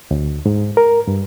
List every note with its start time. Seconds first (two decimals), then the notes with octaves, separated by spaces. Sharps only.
0.11 D2
0.46 G#2
0.77 A#4
1.08 G2